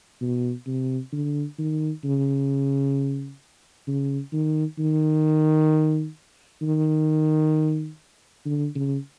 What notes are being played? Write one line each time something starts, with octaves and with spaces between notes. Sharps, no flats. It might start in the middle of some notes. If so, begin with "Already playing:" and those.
B2
C3
D3
D#3
C#3
C#3
D#3
D#3
D#3
D3
C#3